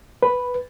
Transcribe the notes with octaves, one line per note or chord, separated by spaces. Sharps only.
B4